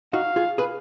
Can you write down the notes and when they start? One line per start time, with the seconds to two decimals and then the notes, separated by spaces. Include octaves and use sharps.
0.13 D#4 F#4 F5
0.36 F4 G#4
0.58 G#4 B4